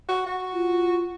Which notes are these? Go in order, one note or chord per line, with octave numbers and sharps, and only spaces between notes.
F#4
F#4
F4